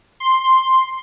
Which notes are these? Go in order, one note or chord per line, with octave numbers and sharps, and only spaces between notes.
C6